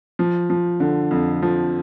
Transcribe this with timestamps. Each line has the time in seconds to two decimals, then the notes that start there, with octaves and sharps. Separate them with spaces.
0.19 F3
0.50 F3
0.80 D3
1.11 F2
1.42 F3